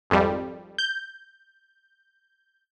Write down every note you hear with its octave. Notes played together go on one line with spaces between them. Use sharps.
G#1 F2 G3
G6